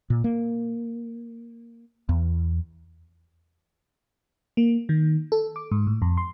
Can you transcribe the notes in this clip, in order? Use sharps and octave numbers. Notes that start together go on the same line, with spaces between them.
A#2
A#3
E2
A#3
D#3
A4
D6
G#2
A2
F2
C6